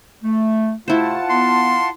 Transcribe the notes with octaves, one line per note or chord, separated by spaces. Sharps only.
A3
C3 A3 E4 F4 C5 F#5 A5
B3 C6